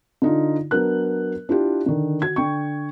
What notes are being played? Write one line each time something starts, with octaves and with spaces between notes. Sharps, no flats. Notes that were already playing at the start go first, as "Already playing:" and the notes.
D3 D#4 F4
F#3 B3 D4 A#4 F#6
D4 E4 F4 G4
D3 D#3
F#4 G#6
D3 G5 C#6